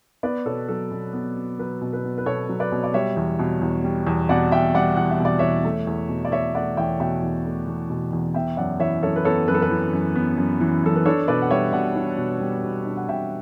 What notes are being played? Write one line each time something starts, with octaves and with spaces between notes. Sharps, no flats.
B3 B4 D5
B2 A4 C#5
F#3 A4
B2
B3
B2
F#3 B4
B2
B4
B3
B4
B2 A4 C#5
F#3
B4 D5
B2
D5
G3 C#5 E5
E2
B2
E2
G3
E2
B2 D5 F#5
E2 E5 G5
G3 D5 F#5
E2 F#5
E5
B2
D5
E2 C#5 E5
A3
E2
B2
D5
E2 C#5 E5
A3 D5 F#5
E2 E5 G5
B2 E5 G5
E2
A3
E2
B2
E2
B3 E5 G5
F#2 D5 F#5
E3 C#5 E5
F#2 A4 C#5
B4
B3 A4 C#5
F#2 B4
A4
B4
E3
F#2
B3
F#2
E3
F#2 A4
B4
D4 A4 C#5
B2 B4 D5
F#5
G3 C#5 E5
B2 D5 F#5
D4
B2
G3
B2
D4
F#5
B2 E5 G5